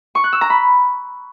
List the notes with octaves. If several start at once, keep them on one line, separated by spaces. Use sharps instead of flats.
C#6
F#6
E6
A#5
B5